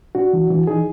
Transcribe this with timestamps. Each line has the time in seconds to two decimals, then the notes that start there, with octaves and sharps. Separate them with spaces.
0.15 D4 F#4
0.33 E3
0.51 E3
0.67 D#4 G#4